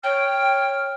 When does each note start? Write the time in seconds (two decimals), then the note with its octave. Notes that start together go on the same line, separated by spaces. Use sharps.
0.03 C#5 G5 F6